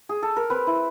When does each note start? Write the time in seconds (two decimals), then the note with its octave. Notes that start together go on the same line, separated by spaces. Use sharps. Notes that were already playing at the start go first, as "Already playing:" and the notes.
0.09 G#4
0.23 A4
0.36 A#4
0.50 C4 B4
0.67 E4